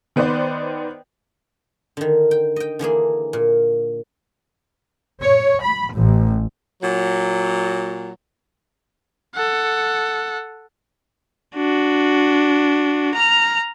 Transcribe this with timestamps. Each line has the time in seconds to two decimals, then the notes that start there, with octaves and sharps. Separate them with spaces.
0.16 D#3 B3 B4 C5 D5
1.97 D3 D#3
2.31 G5
2.56 D#5 G5
2.79 D3 E3 A#3 G#4
3.33 A#2
5.24 C#5
5.61 B5
5.94 A1
6.82 A#2 F#3
9.35 A4 F#5
11.56 D4 F#4
13.14 A#5 F6